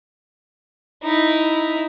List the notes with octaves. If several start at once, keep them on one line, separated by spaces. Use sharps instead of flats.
D#4 E4